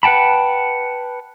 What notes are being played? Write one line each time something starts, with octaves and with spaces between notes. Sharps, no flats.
B4 F#5 G5 A5 B5